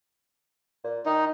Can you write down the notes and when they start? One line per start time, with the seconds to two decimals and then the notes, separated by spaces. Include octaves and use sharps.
0.84 A#2
1.06 D#3 D#4